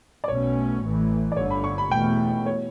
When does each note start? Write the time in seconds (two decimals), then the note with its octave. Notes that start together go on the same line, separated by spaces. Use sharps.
0.24 D5
0.28 B1 B2 A3 C#4 C#5
0.82 A1 A2 E3 A3
1.32 D5
1.37 G1 G2 D3 C#5
1.50 B5
1.64 C#6
1.78 B5
1.91 E2 B2 A3 G5
2.46 C#5